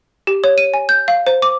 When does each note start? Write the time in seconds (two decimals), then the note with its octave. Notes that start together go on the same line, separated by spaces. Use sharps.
0.27 G4
0.44 C#5
0.58 D#7
0.74 G#5
0.89 G6
1.08 F5
1.27 C5
1.42 D6